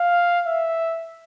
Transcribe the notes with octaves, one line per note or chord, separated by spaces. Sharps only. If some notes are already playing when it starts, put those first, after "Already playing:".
Already playing: F5
E5